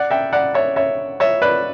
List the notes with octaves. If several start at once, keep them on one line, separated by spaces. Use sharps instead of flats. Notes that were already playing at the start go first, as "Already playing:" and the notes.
Already playing: D5 F#5
E5 G5
D5 F#5
C#5 E5
C#5 E5
C#5 E5
B4 D5